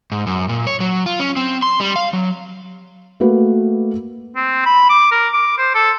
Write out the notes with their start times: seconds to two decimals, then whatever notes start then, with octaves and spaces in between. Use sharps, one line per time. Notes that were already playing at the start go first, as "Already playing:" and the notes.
0.12 G#2
0.27 F#2
0.49 A#2
0.67 C#5
0.80 F#3
1.06 F4
1.20 C#4
1.36 C4
1.62 C6
1.80 G3
1.96 F5
2.13 F#3
3.20 A3 A#3 F#4 B4
4.36 C4
4.66 B5
4.90 D6
5.11 A#4
5.34 D6
5.58 C5
5.74 A4